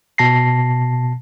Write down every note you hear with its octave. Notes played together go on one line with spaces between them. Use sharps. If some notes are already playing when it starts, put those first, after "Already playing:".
B2 A5 A#6 C7